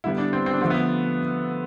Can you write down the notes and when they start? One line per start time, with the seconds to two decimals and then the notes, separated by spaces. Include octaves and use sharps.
0.04 D3 G3 B3 E4
0.18 D4
0.33 C4
0.46 C4
0.53 D4
0.61 D3 F3 A3 C4
0.70 B3